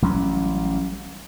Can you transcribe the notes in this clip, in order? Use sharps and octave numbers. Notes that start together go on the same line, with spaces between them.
A1 F#3 G3 C#4